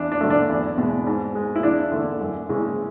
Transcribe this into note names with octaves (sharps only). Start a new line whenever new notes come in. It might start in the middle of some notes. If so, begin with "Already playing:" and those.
Already playing: E2 D4
D4
D3 F#3 A3
D4
E2
B2 G#3
G#2
G#3
E4
E2 D4
D3 A3
F#2
C#3 E3 G#3